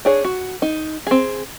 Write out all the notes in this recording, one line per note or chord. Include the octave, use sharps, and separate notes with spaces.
D4 G#4 C#5
F#4
D#4
C4 G#4